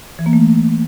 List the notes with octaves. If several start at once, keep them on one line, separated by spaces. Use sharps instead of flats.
E3
A#3
A3